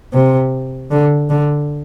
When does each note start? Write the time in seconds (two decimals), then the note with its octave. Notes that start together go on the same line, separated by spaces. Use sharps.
0.14 C3
0.91 D3
1.30 D3